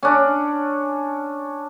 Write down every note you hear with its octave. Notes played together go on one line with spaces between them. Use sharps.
C#4 D4